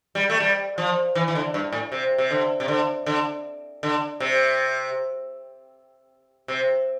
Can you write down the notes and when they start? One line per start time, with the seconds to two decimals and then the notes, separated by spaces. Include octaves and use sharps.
0.15 G3
0.30 A3
0.40 G3
0.78 F3
1.15 E3
1.28 E3
1.35 D3
1.54 G2
1.72 A2
1.92 C3
2.18 C3
2.31 D3
2.60 C3
2.68 D3
3.06 D3
3.83 D3
4.20 C3
6.48 C3